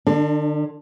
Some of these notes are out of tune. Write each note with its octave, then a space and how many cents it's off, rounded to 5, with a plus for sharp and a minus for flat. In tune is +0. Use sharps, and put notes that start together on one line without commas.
D3 +45 D4 +0